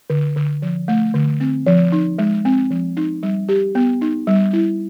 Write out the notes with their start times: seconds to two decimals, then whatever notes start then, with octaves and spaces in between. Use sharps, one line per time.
0.10 D3
0.36 D3
0.62 F3
0.88 A3
1.14 D3
1.40 C4
1.66 F3
1.92 D#4
2.18 G#3
2.45 C4
2.70 F3
2.97 D#4
3.23 G3
3.49 G4
3.75 B3
4.01 D#4
4.27 G3
4.53 E4